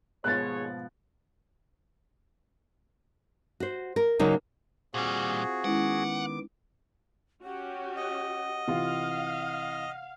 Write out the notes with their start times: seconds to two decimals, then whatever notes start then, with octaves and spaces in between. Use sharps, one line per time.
0.24 D#2 G#2 B2 F3 G#4 C#5 F#6 A6
3.60 F#4 C5
3.96 A#4
4.19 C#3 F#3 A#3 D#4
4.94 A#2 G3 C4 F4 F#4 G#4
5.64 D#3 G#3 B3 C#4 E4 F#5 D6
7.43 C#4 F#4 G4 F#5
7.96 D#5
8.68 C3 E3 F4 F5